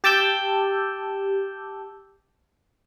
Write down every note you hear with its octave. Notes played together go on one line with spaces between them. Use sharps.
G4 A5 D6 E6 G6